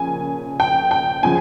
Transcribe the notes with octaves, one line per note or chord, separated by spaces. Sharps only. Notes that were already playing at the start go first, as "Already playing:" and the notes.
Already playing: C#3 F3 A#3 G#5
G5
G5
C#3 F3 G#3 G#5